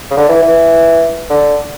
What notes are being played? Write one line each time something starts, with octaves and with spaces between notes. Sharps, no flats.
C#3
D3
E3
E3
D3